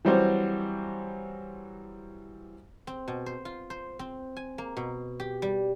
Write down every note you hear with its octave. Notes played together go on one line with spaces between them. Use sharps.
E3 F#3 G3 C4 F#4 C5
C4
B2
C5
F4
C5
C4
G#5
A#3
B2
G4
G3